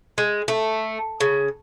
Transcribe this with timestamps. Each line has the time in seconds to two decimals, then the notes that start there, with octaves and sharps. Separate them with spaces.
0.18 G#3
0.48 A3
1.20 C#3